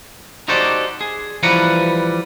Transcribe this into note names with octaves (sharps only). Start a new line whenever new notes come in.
D#4 F#4 G4 A4 C5 D5
G#4
E3 F3 G3 B4 F#5 A#5